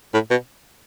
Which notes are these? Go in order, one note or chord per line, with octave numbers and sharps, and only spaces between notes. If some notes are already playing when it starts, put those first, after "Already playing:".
A2
B2